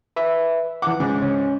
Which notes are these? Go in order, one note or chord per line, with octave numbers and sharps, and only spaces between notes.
B4 E5
E3 F#5 D6
G#2 C#3
C#4